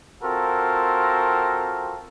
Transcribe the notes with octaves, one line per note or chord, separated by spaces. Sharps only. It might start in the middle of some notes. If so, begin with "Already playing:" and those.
C4 F4 F#4 A4 A#4